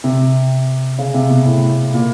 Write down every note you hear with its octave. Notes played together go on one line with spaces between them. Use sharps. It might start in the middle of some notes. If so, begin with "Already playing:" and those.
C3
C#3
C3
B2
A2
A#2